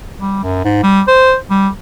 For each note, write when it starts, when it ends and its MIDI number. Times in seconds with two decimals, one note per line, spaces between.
0.21 0.39 55
0.44 0.64 42
0.65 0.82 44
0.83 1.01 55
1.08 1.35 72
1.50 1.68 55